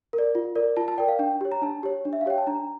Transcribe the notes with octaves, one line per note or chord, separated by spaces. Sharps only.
A#4
D5
F4
A#4 D5
F4 A5
A5
A#4 D5 G5
F5
D4 G5
G4 C#5
A#5
D4 A5
G4 C#5
D4
E5
F5
G4 C#5 G5
A5
D4 A#5